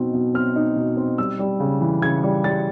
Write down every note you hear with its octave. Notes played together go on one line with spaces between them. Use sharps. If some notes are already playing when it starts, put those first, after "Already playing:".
Already playing: B2 C4 D#4
B2
C4 F6
D#4
B2
C4
G3 E6
G3
C#3
E3
C#3 G#6
G3
G3 A6